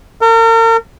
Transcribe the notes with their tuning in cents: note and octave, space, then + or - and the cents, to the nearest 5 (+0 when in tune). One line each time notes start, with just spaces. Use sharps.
A#4 -40